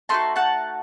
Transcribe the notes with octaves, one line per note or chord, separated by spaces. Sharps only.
A3 D#4 F#4 A5 C6
F#5 A5